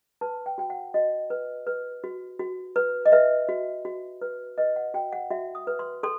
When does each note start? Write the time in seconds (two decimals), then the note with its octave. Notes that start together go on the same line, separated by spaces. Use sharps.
0.21 B4 A5
0.46 G5
0.58 F#4 G5
0.70 F#5
0.94 F#4 D#5
1.30 B4
1.67 B4
2.04 F#4
2.39 F#4
2.76 B4
3.06 D#5
3.12 B4 E5
3.49 F#4
3.85 F#4
4.21 B4
4.58 B4 D#5
4.76 F#5
4.94 F#4 G5
5.13 F#5
5.30 F#4 E5
5.55 D#6
5.67 B4
5.79 C6
6.03 A4 C6